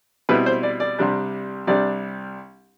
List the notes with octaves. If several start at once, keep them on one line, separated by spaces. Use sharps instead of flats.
B2 G3 C4 E4 B4
C5
D5
D5
C2 C3 G3 D4
C2 C3 G3 D4 D5